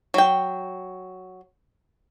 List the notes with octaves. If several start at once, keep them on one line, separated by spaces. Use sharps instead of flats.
F#3 G5